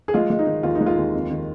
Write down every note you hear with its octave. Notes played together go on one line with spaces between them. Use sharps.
G#4
G#3 F4
G#3
D#4
D#3
D#2 F4
D#4
G#3
F4
D#2
F2
D#3